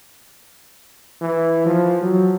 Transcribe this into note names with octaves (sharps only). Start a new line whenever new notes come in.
E3
F3
F#3